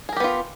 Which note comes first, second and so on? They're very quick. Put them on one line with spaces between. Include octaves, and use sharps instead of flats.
G#4 A#4 G4 B3 F4